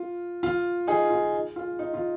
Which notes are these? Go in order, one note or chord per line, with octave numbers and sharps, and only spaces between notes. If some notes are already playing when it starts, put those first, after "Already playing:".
Already playing: F4
F4
D#4 G#4
F4
F4
D#4
F4